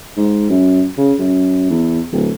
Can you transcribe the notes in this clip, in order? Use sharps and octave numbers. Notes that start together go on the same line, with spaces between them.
G#2
F#2
C#3
F#2
E2
D1